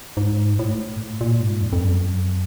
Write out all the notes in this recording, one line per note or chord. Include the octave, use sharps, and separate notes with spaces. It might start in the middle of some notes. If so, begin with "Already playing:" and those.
G#2
A2
A#2
G#2
F2
F2
F#2